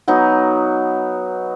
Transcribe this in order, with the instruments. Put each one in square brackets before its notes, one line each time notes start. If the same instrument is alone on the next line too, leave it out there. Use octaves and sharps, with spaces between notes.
[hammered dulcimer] F#3 B3 D#4